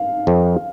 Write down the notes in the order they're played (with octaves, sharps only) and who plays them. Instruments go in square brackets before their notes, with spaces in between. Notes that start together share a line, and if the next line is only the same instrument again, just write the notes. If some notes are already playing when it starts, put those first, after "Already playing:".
Already playing: [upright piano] F5
[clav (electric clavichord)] F2